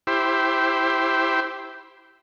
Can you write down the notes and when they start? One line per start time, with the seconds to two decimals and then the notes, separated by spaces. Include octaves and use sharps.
0.07 E4 G4 C5